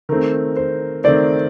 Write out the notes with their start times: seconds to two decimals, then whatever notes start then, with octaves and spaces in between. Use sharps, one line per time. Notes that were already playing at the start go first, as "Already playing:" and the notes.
0.09 D#3 A3 C4 A#4
0.57 C5
1.04 D#3 A3 C4 D5